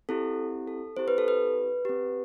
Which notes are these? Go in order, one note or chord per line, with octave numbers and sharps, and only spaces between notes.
C4 E4 G4 A4
A4
C4 E4 G4 C5
B4
A4
B4
C4 G4